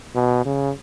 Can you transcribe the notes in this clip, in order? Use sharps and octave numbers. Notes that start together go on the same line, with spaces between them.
B2
C#3